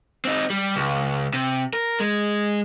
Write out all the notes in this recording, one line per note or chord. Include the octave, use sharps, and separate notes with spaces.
C4 D#4
G3
C#2
C3
A#4
G#3